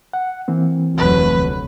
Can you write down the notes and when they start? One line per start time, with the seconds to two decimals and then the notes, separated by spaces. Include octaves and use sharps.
0.13 F#5
0.48 E3 A#3 C4
0.98 F1 D2 F#3 B4